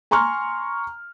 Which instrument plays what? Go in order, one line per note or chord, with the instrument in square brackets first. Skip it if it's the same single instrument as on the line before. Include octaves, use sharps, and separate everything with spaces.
[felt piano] G#5 A#5 C6 C#6 F6